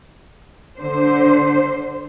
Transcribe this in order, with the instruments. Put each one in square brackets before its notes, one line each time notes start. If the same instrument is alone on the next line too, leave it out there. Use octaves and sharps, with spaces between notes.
[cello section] D3 C5